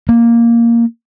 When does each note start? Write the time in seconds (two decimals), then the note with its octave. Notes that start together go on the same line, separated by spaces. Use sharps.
0.09 A#3